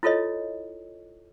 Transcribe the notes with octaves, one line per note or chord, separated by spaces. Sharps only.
E4 F4 A4 C#5 D#5